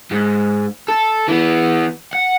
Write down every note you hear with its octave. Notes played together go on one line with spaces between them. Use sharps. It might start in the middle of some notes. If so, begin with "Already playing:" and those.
G#2
A4
E3 B3
F#5